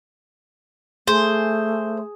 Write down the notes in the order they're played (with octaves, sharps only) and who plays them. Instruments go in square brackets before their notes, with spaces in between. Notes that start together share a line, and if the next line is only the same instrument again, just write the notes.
[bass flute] A3 [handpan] G#4 [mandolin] C5